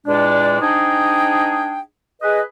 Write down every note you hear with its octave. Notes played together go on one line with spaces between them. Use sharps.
E2 A#2 G#3 D4
C4 D4 D#4 G#4 D#5 G5
G#4 B4 D#5